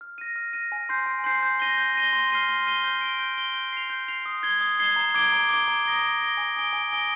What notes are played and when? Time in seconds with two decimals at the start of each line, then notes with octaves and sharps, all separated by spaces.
0.01 F6
0.18 A#6 D#7
0.36 F6
0.53 A#6 D#7
0.72 G#5
0.89 C6 G6 C7
1.06 G#5
1.24 C6 G6 C7
1.42 G6
1.60 A#6 D#7 G7
1.77 G6
1.95 A#6 D#7 G7
2.13 C6
2.31 F6 C7 D#7 G7
2.49 C6
2.66 F6 C7 D#7 G7
2.84 G6
3.01 D7 G7
3.19 G6
3.37 D7 G7
3.54 G6
3.73 C7 F7
3.90 G6
4.08 C7 F7
4.26 D#6
4.43 G#6 C7 G7
4.61 D#6
4.79 G#6 C7 G7
4.96 A#5
5.14 D6 G#6 D7 G7
5.32 A#5
5.49 D6 G#6 D7 G7
5.68 A#5
5.85 D#6 A#6 D7 G7
6.02 A#5
6.21 D#6 A#6 D7 G7
6.37 G#5
6.56 D#6 A#6 D7 G7
6.73 G#5
6.91 D#6 A#6 D7 G7